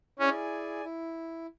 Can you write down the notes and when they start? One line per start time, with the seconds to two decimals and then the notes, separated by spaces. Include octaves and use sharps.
0.19 C#4 E4 G#4 D5 G#5
0.84 E4